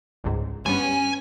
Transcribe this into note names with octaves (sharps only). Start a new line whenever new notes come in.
G1 C#2 G#2
G2 G3 B3 C#4 G#5